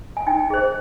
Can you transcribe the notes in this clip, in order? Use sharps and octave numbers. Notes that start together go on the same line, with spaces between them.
G#5
D#4 G5
G#4 C5